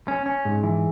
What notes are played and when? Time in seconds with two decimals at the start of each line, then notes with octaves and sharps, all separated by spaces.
0.08 C#4
0.26 C#4
0.45 G#2
0.63 E3